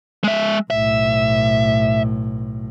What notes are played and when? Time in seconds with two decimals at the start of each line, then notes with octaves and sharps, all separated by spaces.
0.24 G#3 E5
0.70 B1 A2 E5